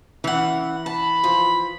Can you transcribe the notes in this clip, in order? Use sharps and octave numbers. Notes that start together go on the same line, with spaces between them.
E3 C#4 F#5
A5 B5
F3